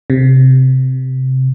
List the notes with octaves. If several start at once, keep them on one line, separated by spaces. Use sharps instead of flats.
C3